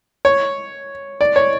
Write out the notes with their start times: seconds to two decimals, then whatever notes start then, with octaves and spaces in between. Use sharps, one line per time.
0.25 C#5
1.21 D5
1.36 C#5